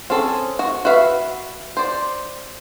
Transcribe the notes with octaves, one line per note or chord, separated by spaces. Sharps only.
C4 C#4 G#4 A4
F#4
F#4 B4 E5 F5
C5 D5